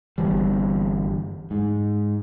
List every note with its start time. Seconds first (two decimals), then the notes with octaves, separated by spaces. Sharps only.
0.18 G1 E3 G3
1.51 G#2